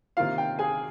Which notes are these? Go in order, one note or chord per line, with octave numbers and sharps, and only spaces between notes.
C3 D#3 A#3 F4 F5
G5
G#4 G#5